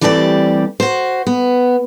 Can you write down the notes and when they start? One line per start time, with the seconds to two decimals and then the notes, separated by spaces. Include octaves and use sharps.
0.01 E3 G3 A3 C4 G4 D5
0.80 F#4 C5
1.27 B3